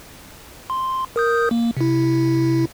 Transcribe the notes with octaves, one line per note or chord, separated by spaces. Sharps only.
C6
A#4 D#6 G6
A#3
C3 E4